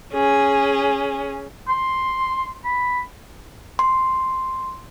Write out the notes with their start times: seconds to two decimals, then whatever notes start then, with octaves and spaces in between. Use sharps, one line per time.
0.13 C#4 G#4
1.68 C6
2.64 B5
3.79 C6